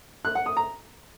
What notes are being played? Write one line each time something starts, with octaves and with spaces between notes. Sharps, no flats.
F#6
F#5
D#6
A#5